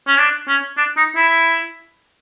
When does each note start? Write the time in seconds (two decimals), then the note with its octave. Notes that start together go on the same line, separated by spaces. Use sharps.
0.07 C#4
0.19 D4
0.48 C#4
0.77 D4
0.97 D#4
1.16 E4